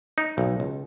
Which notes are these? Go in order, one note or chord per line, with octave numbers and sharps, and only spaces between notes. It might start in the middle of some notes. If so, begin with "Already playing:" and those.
D#4
B1
C#2